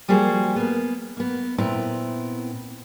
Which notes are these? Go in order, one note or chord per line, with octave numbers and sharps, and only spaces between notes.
F3 G3 A#3 F#4 G#4 C5
A#3 B3
A#3 B3
A#2 B3 C4 E4 A#5